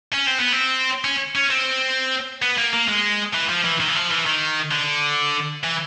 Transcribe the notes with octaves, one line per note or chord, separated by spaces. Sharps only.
C#4
C4
B3
C4
C#4
C#4
C4
B3
A#3
A#3
G#3
E3
F3
E3
D#3
E3
F3
E3
D#3
D3
E3